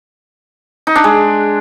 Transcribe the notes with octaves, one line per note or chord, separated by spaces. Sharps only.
D#4
D4
G#3